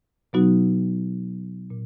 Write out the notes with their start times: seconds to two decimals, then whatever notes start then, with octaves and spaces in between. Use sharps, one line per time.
0.33 B2 F#3 B3 D#4 F#4
1.70 A#2